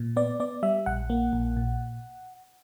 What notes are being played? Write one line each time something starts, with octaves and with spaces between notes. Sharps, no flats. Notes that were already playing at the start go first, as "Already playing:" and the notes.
Already playing: A#2
B3 D5
B3 D5
G3 E5
A#1 F#5
A#3
A#1
A#2